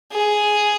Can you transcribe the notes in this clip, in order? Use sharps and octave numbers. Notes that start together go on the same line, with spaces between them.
G#4